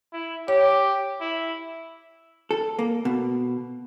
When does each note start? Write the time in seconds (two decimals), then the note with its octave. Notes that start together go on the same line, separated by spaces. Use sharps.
0.13 E4
0.48 G4 C#5
1.21 E4
2.51 A4
2.79 A#3
3.05 B2